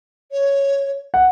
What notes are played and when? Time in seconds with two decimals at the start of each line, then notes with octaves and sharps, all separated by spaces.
0.31 C#5
1.14 F#5